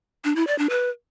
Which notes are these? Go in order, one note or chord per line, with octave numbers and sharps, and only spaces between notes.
D4
E4
D5
D4
B4